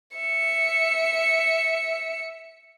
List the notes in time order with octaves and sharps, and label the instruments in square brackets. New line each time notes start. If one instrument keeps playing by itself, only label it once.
[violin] E5 C#7